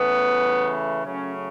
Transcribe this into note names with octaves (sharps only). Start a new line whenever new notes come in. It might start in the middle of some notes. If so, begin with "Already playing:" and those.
Already playing: C#3 E3 A3 B3
C#3 F#3 A3 C#4